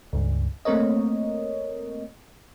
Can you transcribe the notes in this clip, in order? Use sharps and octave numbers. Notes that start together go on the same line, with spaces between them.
C#2 G2
A3 A#3 C4 A#4 C#5 D#5